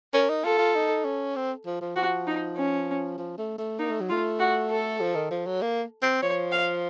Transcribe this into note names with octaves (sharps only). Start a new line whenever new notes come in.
C#4 A#4
D#4
F4 A4
F4
D#4
C#4
C4
F3
F3
F3 F#4
D#4
C#4
F3
A3
A3
A#3 D#4
A3
F#3
A3 F4
F#4
A4
F3
D#3
F3
F#3
A#3
C4
F3 C#5
F5